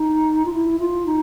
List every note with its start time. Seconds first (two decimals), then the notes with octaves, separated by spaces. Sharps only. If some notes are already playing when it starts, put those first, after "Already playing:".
Already playing: D#4
0.45 F4
0.53 E4
0.79 F4
1.06 D#4